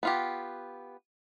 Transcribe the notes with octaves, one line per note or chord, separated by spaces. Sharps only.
B3 F4 G4